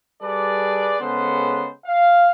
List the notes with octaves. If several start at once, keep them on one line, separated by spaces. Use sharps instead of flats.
G3 G#4 A4 B4 D5
C#3 G#3 B3 A4 B4 C5
F5